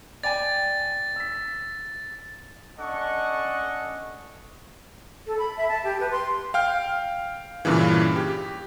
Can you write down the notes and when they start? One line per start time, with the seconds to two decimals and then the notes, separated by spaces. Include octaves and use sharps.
0.23 D5 G5 G#5 A6
1.16 E6 B6
2.79 C#4 D4 A4 D#5 F#5 C#6
5.27 A4
5.39 B5
5.57 E5
5.69 A5
5.84 G4
6.00 B4
6.11 C6
6.54 F5 G5 F6
7.65 G2 A#2 C#3 E3
8.16 G4